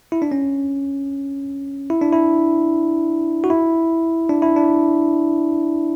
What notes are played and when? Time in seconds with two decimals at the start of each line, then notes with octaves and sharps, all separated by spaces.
0.12 E4
0.22 D4
0.32 C#4
1.90 E4
2.01 D4
2.13 E4
3.44 F#4
3.50 E4
4.29 D4
4.42 E4
4.56 D4